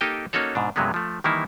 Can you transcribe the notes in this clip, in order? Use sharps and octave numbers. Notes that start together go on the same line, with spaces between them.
A#3 D#4 G4 A4 D#5 G5
A#3 C#4 D#4 F#4 A4 C#5
G#2 B2 D4
G2 C3 F#3 G#3 A#3 B3
F3 A3
D#3 E3 G3 A#3 D#4 E4